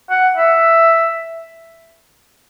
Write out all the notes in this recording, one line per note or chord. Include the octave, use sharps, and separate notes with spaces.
F#5
E5